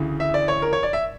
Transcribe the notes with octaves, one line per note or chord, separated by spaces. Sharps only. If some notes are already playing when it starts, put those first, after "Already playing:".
Already playing: D2 C#3 E3
E5
D5
C#5
A#4
C#5
D5
E5